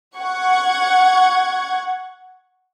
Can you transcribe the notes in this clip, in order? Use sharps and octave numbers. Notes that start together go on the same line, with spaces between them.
F#5 C#6 G#6